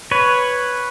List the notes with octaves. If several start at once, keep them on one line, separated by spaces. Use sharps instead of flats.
B4 C#5